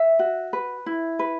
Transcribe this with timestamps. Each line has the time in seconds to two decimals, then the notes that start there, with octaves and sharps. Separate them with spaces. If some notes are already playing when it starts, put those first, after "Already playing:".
Already playing: E5
0.19 F#4
0.53 B4
0.86 E4
1.19 B4